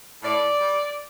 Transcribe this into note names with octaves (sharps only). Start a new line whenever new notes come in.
A2 D5
G3